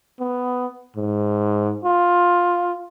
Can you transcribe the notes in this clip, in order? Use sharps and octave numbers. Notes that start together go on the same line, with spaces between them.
B3
G#2
F4